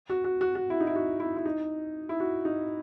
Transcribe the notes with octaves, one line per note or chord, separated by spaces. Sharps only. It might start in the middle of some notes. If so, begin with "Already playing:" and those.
F#4
F#4
F#4
F#4
E4
D#4
E4
F#4
E4
E4
D#4
E4
F#4
D#4